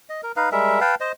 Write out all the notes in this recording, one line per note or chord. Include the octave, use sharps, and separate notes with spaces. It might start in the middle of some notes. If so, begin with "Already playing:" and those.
D#5
A#4
D#4 B4 F5
G3 G#3 A#4 E5
B4 F5 G5 A5
C5 D#5